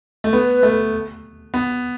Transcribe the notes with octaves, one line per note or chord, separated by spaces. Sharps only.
A3
B3 B4
A3
B3